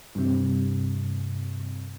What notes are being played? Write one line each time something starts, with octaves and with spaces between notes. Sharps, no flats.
G2 C3